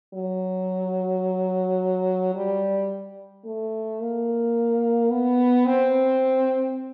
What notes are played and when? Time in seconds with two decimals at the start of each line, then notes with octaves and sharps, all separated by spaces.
0.14 F#3
2.35 G3
3.45 A3
4.01 A#3
5.11 B3
5.66 C4